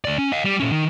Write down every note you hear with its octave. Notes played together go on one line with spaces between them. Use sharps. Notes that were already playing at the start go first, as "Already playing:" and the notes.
D2 D5
C#4
D#5 F5
G3
A#2 C#4
D#3